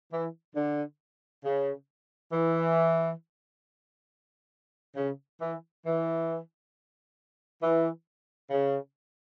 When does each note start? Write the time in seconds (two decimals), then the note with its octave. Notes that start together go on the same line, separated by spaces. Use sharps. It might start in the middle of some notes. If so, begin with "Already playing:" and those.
0.11 E3
0.55 D3
1.44 C#3
2.31 E3
4.96 C#3
5.40 E3
5.85 E3
7.62 E3
8.50 C#3